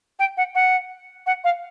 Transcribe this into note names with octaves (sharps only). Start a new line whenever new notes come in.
G5
F#5
F#5
F#5
F5